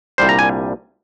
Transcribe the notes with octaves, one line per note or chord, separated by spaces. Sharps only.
C2 A#2 G3 D4 C5
A#5
G#5